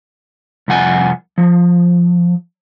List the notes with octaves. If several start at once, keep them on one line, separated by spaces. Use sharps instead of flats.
C2 F2 F#5 G#5
F3